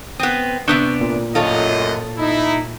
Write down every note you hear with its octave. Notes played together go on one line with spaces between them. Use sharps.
B3 C4 D#6
C3 B3 D4 C#6 E6 G6
A#2
A1 F#2 F4 A4 C#5 D#5
D#4 E4